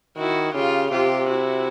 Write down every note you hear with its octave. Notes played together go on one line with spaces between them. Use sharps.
D#3 E4 F#4
C#3 F4 G4
C3 F4 G4
E4 F#4